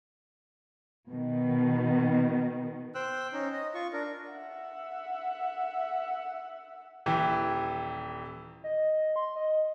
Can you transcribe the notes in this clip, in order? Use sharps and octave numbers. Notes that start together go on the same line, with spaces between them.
B2 D#3
C5 G5 E6 F#6
C#4 D#4
D#5
F4 C#6
D4 A#4
E5 F#5
D#1 E3 G4
D#5
C6
D#5